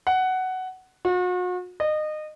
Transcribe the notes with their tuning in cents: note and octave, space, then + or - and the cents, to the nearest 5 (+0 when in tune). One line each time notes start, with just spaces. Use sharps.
F#5 +10
F#4 -40
D#5 -25